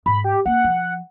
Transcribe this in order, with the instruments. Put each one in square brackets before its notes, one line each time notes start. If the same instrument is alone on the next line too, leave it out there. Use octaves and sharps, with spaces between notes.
[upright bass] G#2 [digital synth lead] B5
[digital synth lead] G4
[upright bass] A#3 C#4 [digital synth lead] F#5
[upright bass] F3